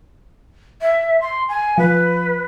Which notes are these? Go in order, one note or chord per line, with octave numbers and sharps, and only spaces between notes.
E5
C6
G#5
F3 B4